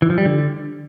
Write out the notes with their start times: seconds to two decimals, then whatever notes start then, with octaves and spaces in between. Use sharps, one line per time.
0.02 E3
0.10 F3
0.18 G3
0.26 D3